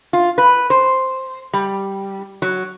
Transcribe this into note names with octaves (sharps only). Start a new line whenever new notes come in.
F4
B4
C5
G3
F#3